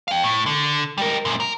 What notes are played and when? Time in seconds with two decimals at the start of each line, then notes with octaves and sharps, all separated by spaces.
0.08 F5 G5
0.24 A2
0.46 D3
0.98 G3 A#4
1.25 F#2 A#2
1.40 A#4